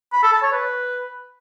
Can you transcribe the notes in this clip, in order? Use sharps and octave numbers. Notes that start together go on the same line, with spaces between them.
B5
A4
A5
C#5
B4